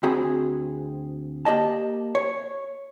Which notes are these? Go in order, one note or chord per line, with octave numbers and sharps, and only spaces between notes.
D2 C4 F#4 G#4 B5
A#3 G4 D5 D#5 A5
C#5